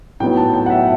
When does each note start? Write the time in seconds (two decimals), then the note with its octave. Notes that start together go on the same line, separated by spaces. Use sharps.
0.20 A2 F#3 B3 D#4 G5
0.37 A5
0.54 G5
0.66 F#5
0.70 E5